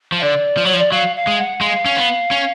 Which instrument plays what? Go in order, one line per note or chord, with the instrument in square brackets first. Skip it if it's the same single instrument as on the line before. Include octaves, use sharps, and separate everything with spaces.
[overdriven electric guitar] F3
[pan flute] F5
[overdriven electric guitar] D3 [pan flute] D5
[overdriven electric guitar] F3
[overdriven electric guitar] F#3 [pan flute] C#5
[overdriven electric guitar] F3
[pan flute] D5
[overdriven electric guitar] F#3 [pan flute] F5
[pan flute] F5
[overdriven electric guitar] G#3
[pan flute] F#5
[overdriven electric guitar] G#3 [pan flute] F5
[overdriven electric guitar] C#4
B3
C#4